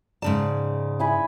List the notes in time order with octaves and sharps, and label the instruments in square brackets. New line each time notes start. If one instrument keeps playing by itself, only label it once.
[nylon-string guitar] G#2 C#3 A5 [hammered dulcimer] D5
[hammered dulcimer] E4 G#5 B5